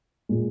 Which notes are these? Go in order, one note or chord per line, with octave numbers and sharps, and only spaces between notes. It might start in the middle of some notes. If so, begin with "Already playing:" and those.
A#2 G#3